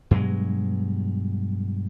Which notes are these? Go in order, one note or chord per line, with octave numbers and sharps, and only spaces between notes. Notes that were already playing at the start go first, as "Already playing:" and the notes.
G2 B2 F#3 G#3